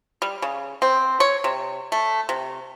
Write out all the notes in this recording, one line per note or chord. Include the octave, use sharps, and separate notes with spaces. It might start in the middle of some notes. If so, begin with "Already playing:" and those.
G3
C#3
C4
C#5
C3
A3
C3